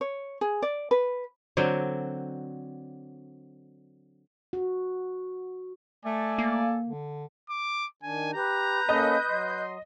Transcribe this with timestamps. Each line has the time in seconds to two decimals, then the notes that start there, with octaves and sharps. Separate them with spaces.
0.01 C#5
0.41 G#4
0.62 D5
0.91 B4
1.57 D3 F#3 C4
4.53 F#4
6.05 A3 A4 D5 G#5
6.38 A#3
6.85 D3
7.50 D6
8.03 D#3 D4 G#5
8.34 G4 B4 A#5 G6
8.89 A#3 C#4 A4 D#5
9.29 F#3 C6